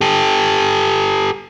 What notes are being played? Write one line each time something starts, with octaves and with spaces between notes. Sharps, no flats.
G4 A4